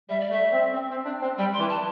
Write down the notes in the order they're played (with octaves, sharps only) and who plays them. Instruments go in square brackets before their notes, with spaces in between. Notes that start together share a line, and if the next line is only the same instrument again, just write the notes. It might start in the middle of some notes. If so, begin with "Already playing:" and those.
[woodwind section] G3 [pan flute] E5
[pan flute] D5
[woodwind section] A3 [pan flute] E5
[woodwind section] C4
C4
C4
D4
C4
[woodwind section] G3 [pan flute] G5
[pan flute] C6
[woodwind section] E3
[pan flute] A5